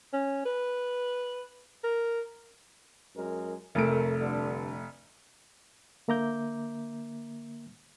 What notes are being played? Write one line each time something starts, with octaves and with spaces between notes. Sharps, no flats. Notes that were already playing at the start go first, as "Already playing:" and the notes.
C#4
B4
A#4
F#2 G#3 A#4
F1 A3 A4 A#4 D7
G2 D3
D3 A#3 E5 A#5 D6 G6